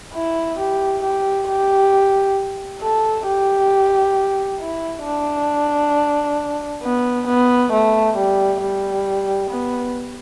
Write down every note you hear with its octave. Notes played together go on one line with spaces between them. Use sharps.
E4
G4
G4
G4
A4
G4
E4
D4
B3
B3
A3
G3
G3
B3